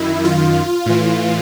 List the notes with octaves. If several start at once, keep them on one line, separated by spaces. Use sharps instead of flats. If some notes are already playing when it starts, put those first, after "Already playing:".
Already playing: F#2 D#3 E4
F4
A2 E3